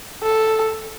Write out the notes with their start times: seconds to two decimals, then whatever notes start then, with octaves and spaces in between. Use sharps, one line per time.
0.23 A4